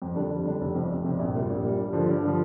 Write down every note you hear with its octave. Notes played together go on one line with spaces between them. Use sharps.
F2
D3 G3 D4
F2
D3 G3 D4
F1
F2 C3
F1
F2 C3
A#1
A#2 G3
A#1
A#2 G3
G2
D3 F3
G2
D3 F3